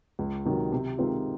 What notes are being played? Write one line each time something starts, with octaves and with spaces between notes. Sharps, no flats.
C#2
C3 D#3 F#3
C3
D#3 G#3 C4 F4